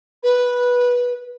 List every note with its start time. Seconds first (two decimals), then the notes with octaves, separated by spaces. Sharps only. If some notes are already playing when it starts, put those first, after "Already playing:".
0.23 B4